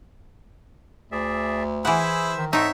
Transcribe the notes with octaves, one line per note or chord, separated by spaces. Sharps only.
D2 G#4 D5 E5
E3 E4 G#4 B4 C5 E5 F#5 E6
D#3
G#2 C4 D#4 A4 C#5 D#5 E5